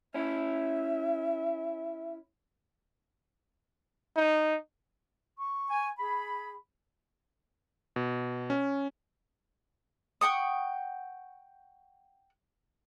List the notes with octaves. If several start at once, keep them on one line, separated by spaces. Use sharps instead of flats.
C#4 E4 E5
D#4
C#6
G#5
G#4 B5
B2
C#4
F#5 G5 C#6 D#6